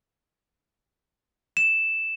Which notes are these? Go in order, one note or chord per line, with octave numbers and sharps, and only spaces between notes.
E7